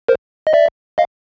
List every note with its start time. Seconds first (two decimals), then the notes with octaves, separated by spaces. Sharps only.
0.09 A#4 C5
0.47 D#5
0.53 D5 E5
0.98 D#5 F5